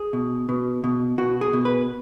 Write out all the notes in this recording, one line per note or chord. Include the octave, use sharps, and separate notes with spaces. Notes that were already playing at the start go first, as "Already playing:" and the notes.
Already playing: G#4
B2
B2
B2
B2 F#4
G#4
B2
B4